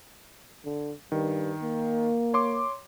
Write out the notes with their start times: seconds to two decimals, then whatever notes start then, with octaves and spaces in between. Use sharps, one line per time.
0.65 D3
1.12 G2 D#3
1.62 A#3
2.34 C#5 C6 D6